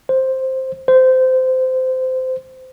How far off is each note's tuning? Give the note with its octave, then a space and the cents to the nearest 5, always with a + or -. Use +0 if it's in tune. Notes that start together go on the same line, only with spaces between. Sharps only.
C5 +5
C5 -20